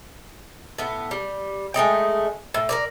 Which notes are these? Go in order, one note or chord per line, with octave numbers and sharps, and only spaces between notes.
A2 B3
G3
G#3 A3 D#4 G5
A2
A#4 B4 D5